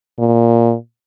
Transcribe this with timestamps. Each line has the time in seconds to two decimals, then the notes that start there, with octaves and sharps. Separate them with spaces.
0.19 A#2